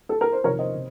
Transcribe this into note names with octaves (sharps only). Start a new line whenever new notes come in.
A4
A#4
C5
F2 C3 D#3 A#4 C#5
C5 D#5
C3